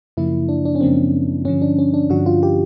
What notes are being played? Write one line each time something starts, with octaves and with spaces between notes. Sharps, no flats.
F#2 C#3 F3 A#3 E4
D4
D4
C#4
F#2 C#3 F3 A#3 C4
G2 D3 F3 C#4
D4
C#4
D4
G2 D3 F3 F#4
F4
G4